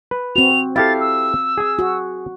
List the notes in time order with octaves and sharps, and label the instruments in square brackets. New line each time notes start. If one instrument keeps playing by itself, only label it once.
[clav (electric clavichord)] B4
[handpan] C4 F#4 [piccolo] F7
[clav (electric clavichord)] E4 G4 A4 [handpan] F5 [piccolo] A6
[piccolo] E6
[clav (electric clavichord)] G#4 G#5
[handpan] F#4